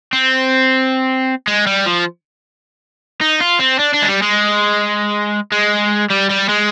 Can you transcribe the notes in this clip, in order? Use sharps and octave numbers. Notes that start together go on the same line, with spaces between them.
C4
G#3
G3
F3
D#4
F4
C4
D4
D4
G#3
G3
G#3
G#3
G3
G3
G#3